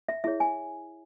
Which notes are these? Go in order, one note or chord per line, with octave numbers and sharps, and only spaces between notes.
E5
E4 G#4 C#5 E5
G#5